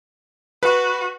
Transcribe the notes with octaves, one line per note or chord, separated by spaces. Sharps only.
F#4 B4